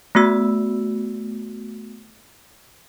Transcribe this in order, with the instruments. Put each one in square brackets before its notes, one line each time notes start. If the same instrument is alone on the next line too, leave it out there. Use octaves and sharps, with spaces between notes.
[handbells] A3 B3 F#4 E6